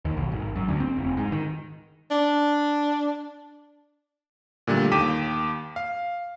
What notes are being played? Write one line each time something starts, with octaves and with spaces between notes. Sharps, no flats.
D#2
B1
G#1
F#2
D2
C4
F1
G#2
D#3
D4
A#2 D3 G3 A3
D#2 G5 D6 B6 D#7 E7
F5